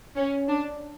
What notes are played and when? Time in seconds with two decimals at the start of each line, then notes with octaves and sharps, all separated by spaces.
0.16 C#4
0.48 D4